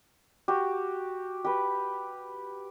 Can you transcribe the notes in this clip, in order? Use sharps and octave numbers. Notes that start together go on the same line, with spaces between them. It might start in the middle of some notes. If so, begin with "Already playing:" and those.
F#4 G4
G4 B4